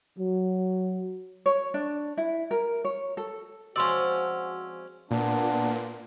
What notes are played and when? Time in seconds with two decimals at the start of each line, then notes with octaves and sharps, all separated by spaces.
0.18 F#3
1.46 C#5
1.74 D4
2.17 E4
2.51 A#4
2.85 C#5
3.17 A4
3.76 F3 G#3 C4 C#4 F#4 D5 C6 E6
5.11 A#2 B3 D4